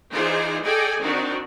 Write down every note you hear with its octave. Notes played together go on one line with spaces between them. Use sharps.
E3 D#4 F4 G#4 C5 D5
G#4 A4 D5 D#5 G5 G#5
D#3 C4 D4 D#4 F#4